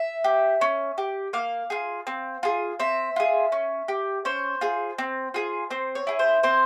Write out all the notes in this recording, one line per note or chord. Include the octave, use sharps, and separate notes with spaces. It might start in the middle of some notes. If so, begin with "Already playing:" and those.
Already playing: E5
G4
C#4
G4
A#3 F5
F4 G#4
C4
F4 G#4
C4 E5
F4 G#4
C#4
G4
C#4 C5
F4 G#4
C4
F4 G#4
C4 C5
C#5
E4 G#4
C5
C4 C5